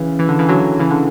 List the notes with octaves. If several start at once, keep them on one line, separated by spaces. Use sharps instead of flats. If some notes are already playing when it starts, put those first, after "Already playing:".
Already playing: C#3 E3
E3
D3
C#3 E3
D3 F#3
C#3 E3
D3